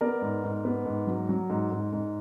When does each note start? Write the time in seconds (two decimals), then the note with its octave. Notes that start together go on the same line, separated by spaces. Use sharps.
0.01 B3 A#4 D5
0.22 G#2
0.44 G#2
0.65 B3
0.85 G#2
1.07 F#3
1.29 F#3
1.50 G#2
1.72 G#2
1.92 G#2